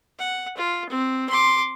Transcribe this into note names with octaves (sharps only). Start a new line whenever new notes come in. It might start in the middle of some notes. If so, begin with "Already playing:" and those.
F#5
F4
C4
C6 D6